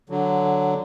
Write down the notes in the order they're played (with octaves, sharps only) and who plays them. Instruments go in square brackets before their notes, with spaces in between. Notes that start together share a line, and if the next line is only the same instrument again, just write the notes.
[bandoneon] D3 F#3